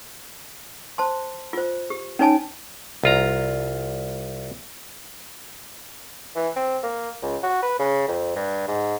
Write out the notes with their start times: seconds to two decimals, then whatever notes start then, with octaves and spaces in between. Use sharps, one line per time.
0.98 C5 A5 C6
1.53 F4 C5
1.90 G4
2.19 C#4 D#4 C#5 G#5 A5
3.04 C2 F4 A#5
6.36 E3
6.56 C4
6.83 A#3
7.22 C#2
7.43 F#4
7.62 B4
7.79 C#3
8.08 F2
8.36 G2
8.68 G#2